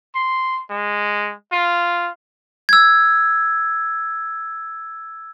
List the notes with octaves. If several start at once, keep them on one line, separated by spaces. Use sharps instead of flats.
C6
G#3
F4
E6 G#6